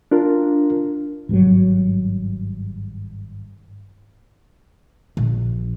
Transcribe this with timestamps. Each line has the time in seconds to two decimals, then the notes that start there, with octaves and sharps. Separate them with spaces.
0.11 D4 F4 A#4
1.29 G#1 G2 D#3 F#3
5.17 A#1